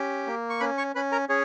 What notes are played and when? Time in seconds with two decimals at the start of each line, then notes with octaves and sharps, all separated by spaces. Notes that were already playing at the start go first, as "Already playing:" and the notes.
Already playing: C#4 G4
0.27 A#3
0.50 C#6
0.60 C#4 B4 B5
0.78 C#5 C#6
0.95 C#4 B4 B5
1.12 A#4 A#5
1.29 C#4 G#4 C#5